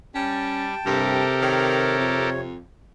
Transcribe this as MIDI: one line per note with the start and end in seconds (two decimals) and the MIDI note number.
0.15 0.75 55
0.15 0.68 61
0.15 1.25 79
0.15 1.25 81
0.85 1.21 43
0.85 2.53 48
0.85 2.30 67
0.85 2.30 69
0.85 2.30 70
1.42 1.99 51
1.42 2.41 73
1.99 2.63 41